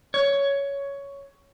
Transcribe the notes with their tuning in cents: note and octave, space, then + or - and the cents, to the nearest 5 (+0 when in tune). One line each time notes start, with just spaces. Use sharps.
C#5 +10